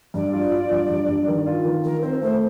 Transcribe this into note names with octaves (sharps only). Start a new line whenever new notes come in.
G2 D5
F4
F4
G2
G2
G2
D#3
F4
D#3
D#3 A#4
C4 C5
A3 C5